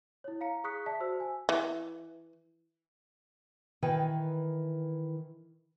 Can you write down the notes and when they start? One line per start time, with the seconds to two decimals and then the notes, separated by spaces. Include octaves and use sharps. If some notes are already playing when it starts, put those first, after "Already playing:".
0.24 E4 C#5
0.41 F5 A#5 C#7
0.64 G#4 C#6 D#6 F#6 B6 C#7
0.86 D5 E5 A5 B6
1.00 F#4 C5 E6
1.20 G#5
1.49 E3
3.82 D#3 E3 B4 G5 G#5